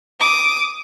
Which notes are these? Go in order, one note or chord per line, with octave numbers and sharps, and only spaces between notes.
D6 D#6